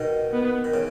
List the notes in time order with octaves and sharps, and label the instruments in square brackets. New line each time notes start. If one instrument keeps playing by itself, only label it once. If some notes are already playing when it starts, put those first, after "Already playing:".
Already playing: [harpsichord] B2 D#3
[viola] B3
[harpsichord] D#3
C#3 E3